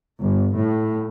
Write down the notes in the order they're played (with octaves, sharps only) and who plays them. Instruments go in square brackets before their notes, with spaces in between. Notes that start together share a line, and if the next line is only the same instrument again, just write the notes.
[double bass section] G1
A2